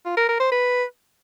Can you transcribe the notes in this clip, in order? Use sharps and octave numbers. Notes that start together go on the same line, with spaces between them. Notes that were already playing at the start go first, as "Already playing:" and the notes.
F4
A#4
A#4
C5
B4